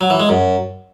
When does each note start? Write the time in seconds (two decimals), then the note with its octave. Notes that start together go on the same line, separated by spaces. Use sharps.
0.01 F#3
0.10 E3
0.20 G#3
0.29 F#2